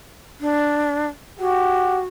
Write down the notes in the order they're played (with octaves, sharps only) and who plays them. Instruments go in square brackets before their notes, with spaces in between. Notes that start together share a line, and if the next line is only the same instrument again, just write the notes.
[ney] D4
[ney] F#4 [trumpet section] G4 F#5